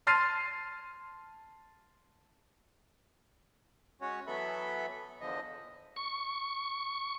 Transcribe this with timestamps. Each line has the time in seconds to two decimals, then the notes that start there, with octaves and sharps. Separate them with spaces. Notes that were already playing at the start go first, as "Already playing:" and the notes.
0.07 A5 C6 F6 A6 C7 D#7
4.01 G#3 C#4 F#4 C#5
4.27 E3 F#3 B3 A4 E5 B5
5.21 E2 D3 F3 D#5
5.96 C#6